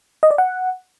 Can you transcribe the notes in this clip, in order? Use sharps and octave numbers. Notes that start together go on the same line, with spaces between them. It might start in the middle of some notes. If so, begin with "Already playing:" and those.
D#5
D5
F#5